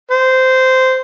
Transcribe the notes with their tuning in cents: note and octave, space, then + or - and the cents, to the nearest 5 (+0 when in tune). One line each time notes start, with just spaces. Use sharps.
C5 -15